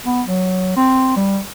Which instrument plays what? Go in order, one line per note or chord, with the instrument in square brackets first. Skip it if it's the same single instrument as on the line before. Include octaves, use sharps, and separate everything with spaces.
[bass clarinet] B3
F#3
C4
G3